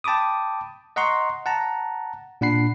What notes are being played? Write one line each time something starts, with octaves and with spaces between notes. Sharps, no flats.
G5 A5 B5 D6 D#6
D#5 F#5 A#5 C6 C#6
F#5 A5 A#5
A#2 D4 F#5 B5 C7